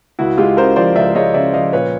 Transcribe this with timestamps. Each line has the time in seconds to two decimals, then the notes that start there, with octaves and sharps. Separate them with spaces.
0.19 C#2 E4 F#4
0.38 G#3 F4 G4
0.57 C#3 A#4 C5
0.76 F3 C5 D5
0.96 C#2 D5 E5
1.15 G#3 C#5 D#5
1.34 C#3 D5 E5
1.54 F3 D#5 F5
1.73 A#2 B4 C#5